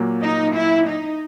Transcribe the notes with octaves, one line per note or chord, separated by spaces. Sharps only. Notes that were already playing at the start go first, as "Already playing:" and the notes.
Already playing: A#2 F#3 A#3
D#4
E4
D#4